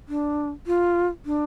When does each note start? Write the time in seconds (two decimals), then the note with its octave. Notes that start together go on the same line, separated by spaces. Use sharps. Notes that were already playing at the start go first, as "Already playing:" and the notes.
0.09 D4
0.67 F4
1.26 D4